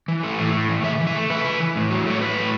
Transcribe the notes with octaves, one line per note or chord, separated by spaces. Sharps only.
E3
A3
A2
A2
E3
C#3 E5
E3
E5
A3
C#3 B4
C#3
E3
A2
F#3
A3 C#5
A2 B4
A2